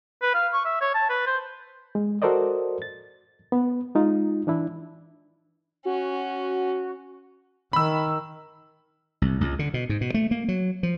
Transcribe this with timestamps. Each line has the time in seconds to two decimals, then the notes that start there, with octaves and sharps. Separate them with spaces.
0.22 B4
0.34 F5
0.53 C#6
0.65 E5
0.81 C#5
0.94 A5
1.10 B4
1.26 C5
1.95 G#3
2.22 F#4 A4 A#4 C5 D5 D#5
2.82 A6
3.52 B3
3.95 G#3 D#4 F4
4.47 E3 D4 E4
5.85 C#4 F#4
7.73 D#3 B5 E6
9.22 C2
9.41 C#2
9.59 D3
9.74 B2
9.89 G#2
10.01 B2
10.14 A3
10.31 A#3
10.48 F#3
10.83 F3